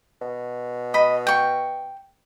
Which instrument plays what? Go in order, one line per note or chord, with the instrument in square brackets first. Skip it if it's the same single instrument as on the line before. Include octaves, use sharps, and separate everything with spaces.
[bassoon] B2
[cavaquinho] D#5 B5
G5 C#6